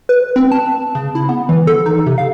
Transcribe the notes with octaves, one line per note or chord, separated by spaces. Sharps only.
B4
C4
A5
C#3
E4
B3
E3
A4
D#4
C3
F5